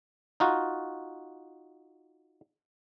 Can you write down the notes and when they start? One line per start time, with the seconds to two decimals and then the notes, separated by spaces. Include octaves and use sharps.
0.40 D#4 F4 F#4